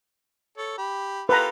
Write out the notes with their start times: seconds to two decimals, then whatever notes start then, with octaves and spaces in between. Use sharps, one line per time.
0.57 A4 C#5
0.78 G4 B5
1.29 F4 G4 A4 B4 A#5